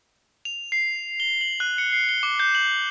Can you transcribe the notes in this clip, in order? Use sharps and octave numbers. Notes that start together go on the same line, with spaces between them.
F7
C7
G7
F#7
F#6
C#7
C7
G7
D6
G6
F#7